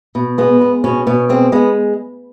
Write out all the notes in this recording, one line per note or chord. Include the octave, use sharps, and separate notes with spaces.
B2
G#3 B3
G#3
B2 C#4
B2 C#4
G#3 C4
G#3 B3